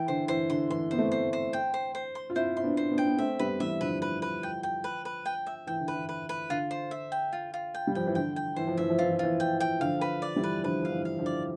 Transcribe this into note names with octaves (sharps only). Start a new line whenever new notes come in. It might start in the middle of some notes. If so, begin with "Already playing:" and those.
Already playing: E3 G5
D3 C5
E3 C5
D3 C6
E3 C6
B3 C5
A3 C4
C5
C5
G5
C5
C5
C6
F4
C4 E4 C5
E4 C6
B3 D4
C5
B3 D4
G5
B3
A3 C4 E5
G3 B3 B4
E3 G3 E5
D3 F3 B4
B4
B4
G5
G5
B4
B4
G5
E5
E3 G5
D3
B4
E3
B4
B4
D3 F4
C5
E5
G5
F4
F4
G5
G3
F3 G5
E3
D3 G5
G5
E3 C5
F3
E3 E5
F3
E3 F4
F3
E3 F4
G5
G5
D3 F3 F5
B4
D5
E3 G3
B4
D3 F3 B4
F3 F5
E3
F5
D3 F3
D5